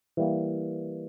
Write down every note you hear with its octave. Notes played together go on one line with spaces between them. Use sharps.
E3 G3 A#3